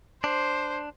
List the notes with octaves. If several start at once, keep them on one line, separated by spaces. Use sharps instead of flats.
D4 C5